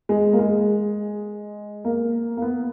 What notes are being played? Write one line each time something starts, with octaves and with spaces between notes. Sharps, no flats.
G#3
A#3
G#3
A#3
A#3
B3